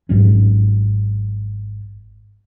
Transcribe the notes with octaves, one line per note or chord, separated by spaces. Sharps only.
G#1 G#2 F#3 C#4